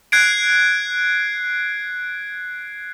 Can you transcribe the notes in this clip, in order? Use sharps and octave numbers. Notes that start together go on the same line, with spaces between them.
F#6 G#6 C7 D7